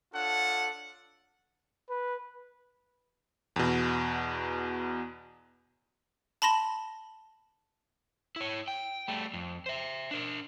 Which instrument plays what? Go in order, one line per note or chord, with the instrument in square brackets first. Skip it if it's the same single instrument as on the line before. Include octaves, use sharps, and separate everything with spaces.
[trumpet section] D4 F4 A4 C#5 F#5
[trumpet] B4
[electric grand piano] E2 B2
[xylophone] A5 B5 C6 A#6 E7
[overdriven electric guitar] E4 C#5
G5
G3 A3
F2
C5 E5
D4 A#4